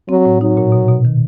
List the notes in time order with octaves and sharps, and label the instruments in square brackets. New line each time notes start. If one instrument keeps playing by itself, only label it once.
[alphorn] F#3 [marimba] C4
[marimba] A2
[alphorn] F#3 [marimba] D#4
[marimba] A#2
B2
B2
D#3